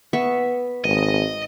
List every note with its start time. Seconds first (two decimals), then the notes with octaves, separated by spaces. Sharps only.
0.13 B3 E5 C#6
0.84 G#1 D#5